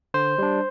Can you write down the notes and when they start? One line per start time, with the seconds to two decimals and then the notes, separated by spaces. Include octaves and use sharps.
0.14 D3 C5
0.38 G3 D4